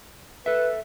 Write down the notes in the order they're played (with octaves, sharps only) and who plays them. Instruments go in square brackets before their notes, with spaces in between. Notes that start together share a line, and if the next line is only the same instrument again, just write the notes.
[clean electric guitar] A4 E5 [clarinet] B4